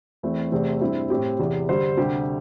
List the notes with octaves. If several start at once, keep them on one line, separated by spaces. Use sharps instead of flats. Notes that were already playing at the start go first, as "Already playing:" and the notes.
E2 E3 A3 C4
E2 C3 A3 C4
G2 G3 C4 E4
A2 A3 C4 G4
E2 C3 E3
G2 D3 G3 C5
D2 C3 G3 C4 G4